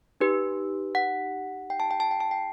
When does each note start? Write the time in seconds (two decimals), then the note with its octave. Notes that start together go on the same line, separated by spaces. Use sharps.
0.20 D#4 G4 B4
0.95 F#5
1.70 G5
1.80 A5
1.91 G5
2.00 A5
2.11 G5
2.20 A5
2.31 G5